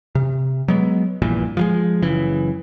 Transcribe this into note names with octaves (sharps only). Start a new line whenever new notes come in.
C3
F#3 G#3 B3
A#1 G2 A#2 E3
F3 F#3 G#3
F#1 C#3 E3